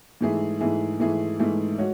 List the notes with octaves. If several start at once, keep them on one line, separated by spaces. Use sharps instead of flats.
G#2 E3 A3 E4 G#4
G#2 E3 A3 E4 G#4
G#2 E3 A3 E4 G#4
G#2 E3 A3 E4 G#4
G#3 F#4 C#5